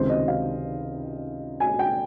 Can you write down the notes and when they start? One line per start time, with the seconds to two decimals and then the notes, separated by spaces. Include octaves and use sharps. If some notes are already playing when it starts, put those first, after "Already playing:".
Already playing: C#2 C3 D#3 C5
0.09 D#5
0.28 F5
1.60 G#5
1.79 G5